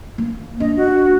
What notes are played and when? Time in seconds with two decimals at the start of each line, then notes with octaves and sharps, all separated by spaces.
0.18 A#3
0.60 A#3 D4 D#5
0.76 F#4